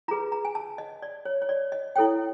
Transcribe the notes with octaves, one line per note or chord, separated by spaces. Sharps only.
F4 G#4 B4 A#5
A#5
G#5
A5
D#5
D5
C#5
C#5
D5
D#5
E4 A4 C#5 G5